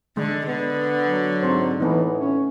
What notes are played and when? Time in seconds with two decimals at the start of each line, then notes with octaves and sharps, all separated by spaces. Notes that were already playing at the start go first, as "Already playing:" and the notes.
0.17 D3 G#3
0.47 D3 B3
1.03 F#3
1.42 G#2 C4 C5
1.80 A2 E3 A3 B3 D#4
2.18 C#4